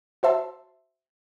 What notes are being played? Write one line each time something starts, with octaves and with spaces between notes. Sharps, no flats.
F#4 C5 E5 A5 C6